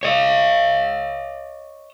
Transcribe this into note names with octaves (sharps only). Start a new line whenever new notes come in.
C#5 D#5